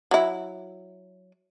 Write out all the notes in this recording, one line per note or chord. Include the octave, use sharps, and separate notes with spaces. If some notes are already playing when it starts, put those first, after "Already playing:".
F#3 E4